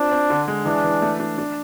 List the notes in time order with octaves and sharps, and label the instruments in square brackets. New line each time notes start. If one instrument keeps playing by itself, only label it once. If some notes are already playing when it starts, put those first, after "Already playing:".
Already playing: [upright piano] C4 F4 [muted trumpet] D4
[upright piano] C4
D3
G#3
[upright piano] E3 [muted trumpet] D4
[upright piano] E3
A3
D4
D4